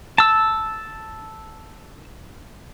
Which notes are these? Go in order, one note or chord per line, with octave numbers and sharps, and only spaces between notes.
A5 E6